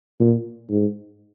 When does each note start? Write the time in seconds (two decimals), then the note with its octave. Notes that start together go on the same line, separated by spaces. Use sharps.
0.20 A#2
0.70 G#2